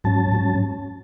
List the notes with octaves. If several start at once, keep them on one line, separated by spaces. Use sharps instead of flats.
G#2 F#3 C#4 A5
G#2 F#3 C#4